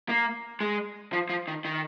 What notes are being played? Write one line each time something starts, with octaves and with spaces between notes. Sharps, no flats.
A#3
G#3
F3
F3
D#3
D#3